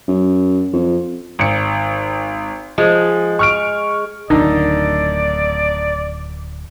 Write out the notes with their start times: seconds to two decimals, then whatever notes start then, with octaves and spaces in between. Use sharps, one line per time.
0.08 F#2
0.73 F2
1.39 G#1 C#7
2.78 F3 G#3
3.39 C#6 F6 D7
4.30 D1 A#1 D3 D#3 D#4 D5